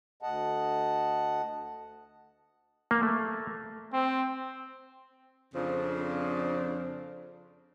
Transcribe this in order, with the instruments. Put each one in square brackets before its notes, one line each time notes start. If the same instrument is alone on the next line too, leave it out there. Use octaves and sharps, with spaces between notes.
[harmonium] D2 D#5 F#5 A5
[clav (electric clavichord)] A#3
A3
[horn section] C4
[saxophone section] F2 C#3 F3 C4 D4